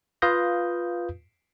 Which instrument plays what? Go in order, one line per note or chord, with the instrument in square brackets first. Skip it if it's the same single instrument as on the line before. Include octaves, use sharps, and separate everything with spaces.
[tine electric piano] F4 B4 F5 D#6 G6 A#6